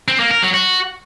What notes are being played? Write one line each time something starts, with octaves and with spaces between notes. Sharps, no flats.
C4
A#3
A#4
F#3
F#4